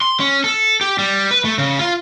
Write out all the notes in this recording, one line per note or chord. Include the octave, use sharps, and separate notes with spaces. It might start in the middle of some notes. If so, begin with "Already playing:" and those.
C6
C#4
A4
G4
G3
B4
A3
C#3
F4